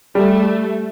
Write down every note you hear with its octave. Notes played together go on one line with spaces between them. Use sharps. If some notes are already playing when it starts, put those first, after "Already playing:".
G3 A3